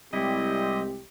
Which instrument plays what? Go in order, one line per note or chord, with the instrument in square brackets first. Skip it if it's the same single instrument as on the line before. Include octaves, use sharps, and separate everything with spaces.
[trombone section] C2 G4 [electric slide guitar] G3 E4 [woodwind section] G#3 C4 [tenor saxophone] D#5